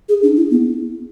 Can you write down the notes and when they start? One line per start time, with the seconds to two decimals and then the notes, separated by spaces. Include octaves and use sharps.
0.09 G#4
0.23 D4
0.37 E4
0.51 B3